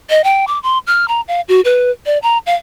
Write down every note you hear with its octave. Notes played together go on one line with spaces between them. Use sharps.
D#5
G5
D6
C6
F6
A#5
F5
F#4
B4
D5
A#5
F5